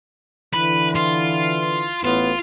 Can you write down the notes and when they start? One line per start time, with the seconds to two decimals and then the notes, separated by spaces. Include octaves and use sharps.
0.54 D3 E3 B4
0.96 F4
2.04 A1 A2 B3 F4